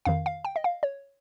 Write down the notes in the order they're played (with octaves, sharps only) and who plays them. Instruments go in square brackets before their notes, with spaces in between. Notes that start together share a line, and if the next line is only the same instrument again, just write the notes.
[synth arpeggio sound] F2 D#3 F5
F5
G5
D#5
F5
C#5